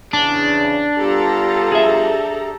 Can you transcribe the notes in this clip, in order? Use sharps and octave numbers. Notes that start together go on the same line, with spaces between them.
E2 C#3 D4
G3 B3 F4 G4 A4 A#5
G#4 E5